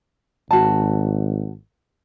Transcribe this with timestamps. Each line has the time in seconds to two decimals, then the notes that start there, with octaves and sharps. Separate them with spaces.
0.51 G#1 F#4 A5